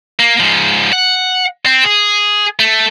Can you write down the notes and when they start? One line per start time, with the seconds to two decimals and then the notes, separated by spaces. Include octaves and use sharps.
0.19 A#3
0.40 G#2 F3
0.93 F#5
1.66 C4
1.84 G#4
2.59 A3